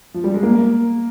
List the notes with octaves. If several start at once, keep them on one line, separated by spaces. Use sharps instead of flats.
F3
G3
G#3
A#3